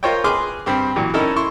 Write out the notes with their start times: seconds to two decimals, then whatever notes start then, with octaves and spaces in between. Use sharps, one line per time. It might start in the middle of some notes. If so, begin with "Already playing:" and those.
0.03 F4 A#4 C5 C#5 D#5 G5
0.24 G#4 B4 C6 D6 F6
0.66 G2 C4 G4
0.96 A#2 E3 F#3 G4
1.14 C#4 D#4 E4 A4 A#4
1.36 E4 C6 C#6